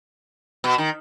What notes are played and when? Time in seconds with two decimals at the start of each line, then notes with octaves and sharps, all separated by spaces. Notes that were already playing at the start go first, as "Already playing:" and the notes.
0.64 B2
0.78 D#3